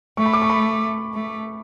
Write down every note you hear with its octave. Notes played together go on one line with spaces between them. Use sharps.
A3 C#6
B5
D6
C#6
B5
A3